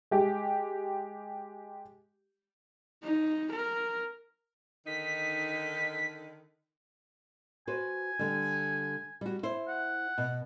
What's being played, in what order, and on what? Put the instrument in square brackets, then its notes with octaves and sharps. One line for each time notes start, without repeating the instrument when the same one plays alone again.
[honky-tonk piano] G#3 G4
[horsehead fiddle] D#4
A#4
[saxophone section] D3 D#3 D#4 [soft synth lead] B6
[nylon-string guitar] F#4 B4 C5 [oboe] G#5
[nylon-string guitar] D3 G3
G3 F#4
E4 C5
[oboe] F#5
[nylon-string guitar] B2